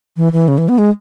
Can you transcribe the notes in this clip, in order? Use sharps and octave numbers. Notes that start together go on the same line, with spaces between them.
E3
E3
C#3
E3
B3
G#3